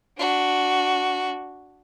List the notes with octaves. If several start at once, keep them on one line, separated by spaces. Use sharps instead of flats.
D4 F#4